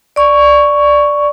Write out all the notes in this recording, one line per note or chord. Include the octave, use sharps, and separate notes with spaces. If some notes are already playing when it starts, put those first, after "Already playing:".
D5 C#6